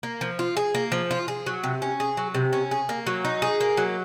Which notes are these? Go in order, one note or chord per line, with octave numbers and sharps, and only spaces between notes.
A#3
F3
F4
G#4
A#3
F3
F4
G#4
F#3
C3
C#4
G#4
F#3
C3
C#4
G#4
A#3
F#3
D#4
G#4
A#3
F#3